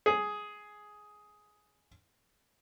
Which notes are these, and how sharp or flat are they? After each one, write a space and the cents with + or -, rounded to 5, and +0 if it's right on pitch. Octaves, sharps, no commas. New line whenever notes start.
G#4 +5